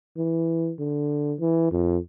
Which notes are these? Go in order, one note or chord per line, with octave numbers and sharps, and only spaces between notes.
E3
D3
E3
F2